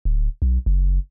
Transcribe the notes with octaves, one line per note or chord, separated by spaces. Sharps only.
D1
B1
F#1